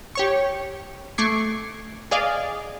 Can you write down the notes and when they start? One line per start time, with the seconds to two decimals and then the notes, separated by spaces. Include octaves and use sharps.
0.15 G4 C#5 C#6
1.18 A3 C#6 D6 G#6 C7
2.11 G#4 D5 D#5 F5